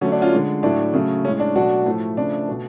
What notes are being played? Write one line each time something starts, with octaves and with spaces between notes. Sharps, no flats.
D3 F#3 A3 C#4
D4
C#4 F4
D3 G#3
A2 F#3 A3 D4
C#3 F#3 A3
A2 G#3 C#4
D4
B2 F#3 A3 D4 F#4
A2 F3 A3
C#3 F3 A3 D4
B2 A3